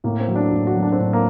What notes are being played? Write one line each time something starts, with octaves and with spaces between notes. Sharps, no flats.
A2 A#3
C4
F#3
D4
A2
F#4
F#3
D4
C4
A2 D4
A#3